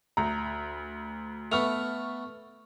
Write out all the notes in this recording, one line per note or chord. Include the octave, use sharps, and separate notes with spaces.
D2 A#5
A3 B3 C#6 F6 F7